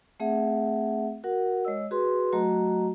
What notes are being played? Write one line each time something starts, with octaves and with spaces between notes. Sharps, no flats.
A3 C4 G#4 E5 F#5
F#4 A#4 F#5
G#3 C#5 D#5 E6
F#4 G#4 B4 C6
F#3 A3 F#4 D#5 A#5